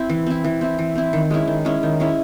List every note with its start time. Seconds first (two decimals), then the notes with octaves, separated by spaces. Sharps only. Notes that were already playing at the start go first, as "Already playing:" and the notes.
Already playing: C4 E4
0.10 E3
0.26 C4 E4
0.44 E3
0.61 C4 E4
0.79 E3
0.95 C4 E4
1.13 D#3
1.31 G#3 C#4 E4
1.47 D#3
1.65 G#3 C#4 E4
1.83 D#3
2.00 G#3 C#4 E4